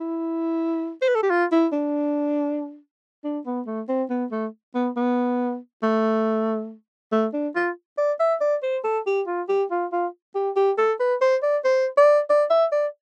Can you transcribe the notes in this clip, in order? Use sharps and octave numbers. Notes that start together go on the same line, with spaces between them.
E4
C5
B4
A4
G4
F4
E4
D4
D4
B3
A3
C4
B3
A3
B3
B3
A3
A3
D4
F4
D5
E5
D5
C5
A4
G4
F4
G4
F4
F4
G4
G4
A4
B4
C5
D5
C5
D5
D5
E5
D5